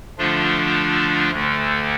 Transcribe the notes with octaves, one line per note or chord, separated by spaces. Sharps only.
D3 F3 A3 D4 F4
D2 D3 A3